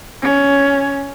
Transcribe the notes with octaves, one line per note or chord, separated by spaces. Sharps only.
C#4